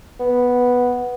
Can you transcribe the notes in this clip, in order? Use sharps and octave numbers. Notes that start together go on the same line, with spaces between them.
B3